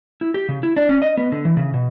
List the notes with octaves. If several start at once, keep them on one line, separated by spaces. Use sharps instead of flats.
E4
G4
C#3
E4
D4
C#4
D#5
B3
D3
E3
C#3
B2